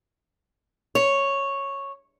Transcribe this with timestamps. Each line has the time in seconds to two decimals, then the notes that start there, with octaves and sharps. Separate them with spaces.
0.95 C#5